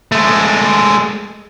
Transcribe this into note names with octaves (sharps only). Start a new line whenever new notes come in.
G#3 A3